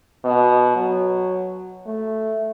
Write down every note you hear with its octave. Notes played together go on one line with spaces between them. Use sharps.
B2
F#3
A3